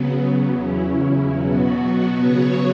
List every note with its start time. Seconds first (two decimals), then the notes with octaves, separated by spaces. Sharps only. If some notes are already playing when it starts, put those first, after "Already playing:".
Already playing: C#3 F#3 B3
0.48 E2 C#3 F#3 C#4 E4
1.34 B2 F#3 B3 F#4
2.20 C#3 F#3 B3 F#4 C#5